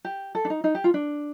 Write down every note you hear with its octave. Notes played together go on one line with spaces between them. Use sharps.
G4
A4
D4
D#4
D#4
G4
F4
D4